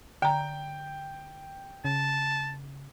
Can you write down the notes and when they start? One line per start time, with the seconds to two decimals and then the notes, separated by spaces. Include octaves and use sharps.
0.22 D3 G5 A#5
1.85 C#3 A5